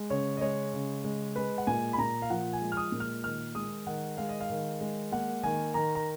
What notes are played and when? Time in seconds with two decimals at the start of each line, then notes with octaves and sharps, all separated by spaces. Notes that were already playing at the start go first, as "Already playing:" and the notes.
Already playing: G#3
0.10 C#3 C#5
0.37 D#5
0.41 G#3 C#5
0.73 C#3
1.04 G#3
1.36 G#3 B4
1.58 F#5
1.67 A#2 G#5
1.93 B5
1.98 A#2 A#5
2.22 F5
2.30 F3 F#5
2.53 G#5
2.62 G#3
2.72 F6
2.77 D#6
2.92 A#2
3.00 F6
3.24 D#3 F6
3.55 G#3 D#6
3.87 D#3 F#5
4.17 G#3 F5
4.29 D#5
4.40 F5
4.50 D#3
4.81 G#3
5.12 A#3 F#5
5.43 D#3 G#5
5.74 D#3 A#5
5.95 A#5